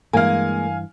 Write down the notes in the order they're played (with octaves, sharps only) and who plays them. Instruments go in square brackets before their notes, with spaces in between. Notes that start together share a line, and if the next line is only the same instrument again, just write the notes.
[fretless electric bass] G2 E3 [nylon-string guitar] G#3 A#3 [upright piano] F5 G#5